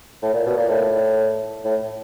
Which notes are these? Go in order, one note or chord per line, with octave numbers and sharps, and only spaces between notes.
A2
A#2
B2
A#2
A2
A2